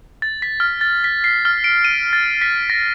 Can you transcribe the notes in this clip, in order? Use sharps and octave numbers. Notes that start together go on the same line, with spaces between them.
A6
B6
F6
A6
B6
C7
F6
D7
D#7
A6
B6
A#6